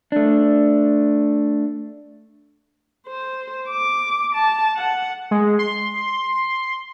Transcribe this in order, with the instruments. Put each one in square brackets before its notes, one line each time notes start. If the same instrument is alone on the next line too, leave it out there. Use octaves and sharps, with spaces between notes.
[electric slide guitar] A3 D4
[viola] C5
D6
A5
F#5
[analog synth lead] G#3
C6